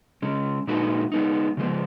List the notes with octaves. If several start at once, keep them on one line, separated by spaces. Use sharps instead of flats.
C#3 G#3 C#4
A#2 G#3 D#4 F#4 B4
G#3 B3 D#4
C#3 F3 G#3 B3